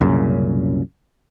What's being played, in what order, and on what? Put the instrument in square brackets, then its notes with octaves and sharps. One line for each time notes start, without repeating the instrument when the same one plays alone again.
[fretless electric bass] C2 F#2 A#2 C#3